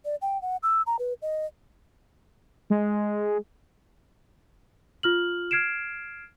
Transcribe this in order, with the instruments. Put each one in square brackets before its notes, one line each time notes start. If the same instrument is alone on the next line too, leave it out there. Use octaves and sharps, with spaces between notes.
[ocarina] D5
G5
F#5
E6
A#5
B4
D#5
[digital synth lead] G#3
[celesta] F4 F6 F#7
F6 G#6 C7 D7 E7